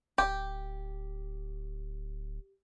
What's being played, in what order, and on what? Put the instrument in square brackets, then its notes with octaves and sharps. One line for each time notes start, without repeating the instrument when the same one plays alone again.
[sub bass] D1 [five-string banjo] G4